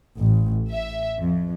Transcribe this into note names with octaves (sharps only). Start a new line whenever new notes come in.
A1
E5
F2